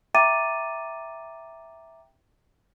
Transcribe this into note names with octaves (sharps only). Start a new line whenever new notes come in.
E5 G5 A#5 D6 A6 D#7